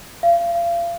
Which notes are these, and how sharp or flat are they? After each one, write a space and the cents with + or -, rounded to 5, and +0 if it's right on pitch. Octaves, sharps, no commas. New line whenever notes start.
F5 -35